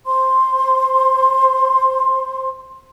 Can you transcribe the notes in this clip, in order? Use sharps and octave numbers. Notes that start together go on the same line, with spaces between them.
C5 C6